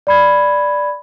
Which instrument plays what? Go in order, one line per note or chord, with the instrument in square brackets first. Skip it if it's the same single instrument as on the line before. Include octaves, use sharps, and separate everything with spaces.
[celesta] D5 B5 G#6